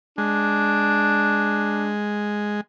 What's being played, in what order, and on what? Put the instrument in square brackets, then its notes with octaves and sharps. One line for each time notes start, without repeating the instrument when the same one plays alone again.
[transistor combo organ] G#3 [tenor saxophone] D4